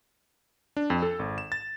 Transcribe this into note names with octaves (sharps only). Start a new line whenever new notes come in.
D4
F2
A4
G#1
E7
A6